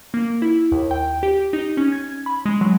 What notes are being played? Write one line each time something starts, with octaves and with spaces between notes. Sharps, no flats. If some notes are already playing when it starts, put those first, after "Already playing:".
A#3
E4
D#2
G5
G4
D#4
C#4
G#6
B5
G#3
F#3